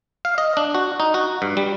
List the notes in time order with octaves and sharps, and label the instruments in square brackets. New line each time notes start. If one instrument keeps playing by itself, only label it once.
[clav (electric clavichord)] F5
D#5
D4
F#4
D#4
F#4
G2
G3